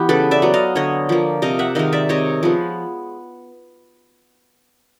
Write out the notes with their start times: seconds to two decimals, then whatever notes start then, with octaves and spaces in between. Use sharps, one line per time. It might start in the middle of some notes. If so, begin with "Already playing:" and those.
Already playing: E3 B3 G4
0.09 C#3 A4 B4
0.31 D5 E5
0.42 F#3 B3
0.54 D#5 F5
0.75 D3 C#5 D#5
1.09 F3 A#3
1.42 C3 D#5 F5
1.59 E5 F#5
1.75 D#3 G#3 D#5 F5
1.92 D5 E5
2.09 C3 C#5 D#5
2.43 F3 G#3 B3